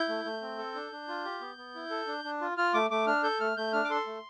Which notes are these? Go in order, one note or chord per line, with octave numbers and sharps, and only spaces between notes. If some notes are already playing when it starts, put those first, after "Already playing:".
Already playing: E4 G6
A3
A3
C4
A4
D4
D4
F4
G4
B3
B3
E4
A4
D4
D4
F4
F4 F6
A3 D6
A3 D6
D4 F6
A4 G6
A3 F6
A3 G6
D4 F6
D6
A4 C6
A3